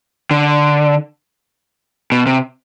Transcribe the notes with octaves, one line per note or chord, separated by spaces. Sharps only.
D3
B2
C3